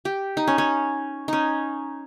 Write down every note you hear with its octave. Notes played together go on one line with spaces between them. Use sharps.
G4
D#4
C#4
C#4
C#4 D#4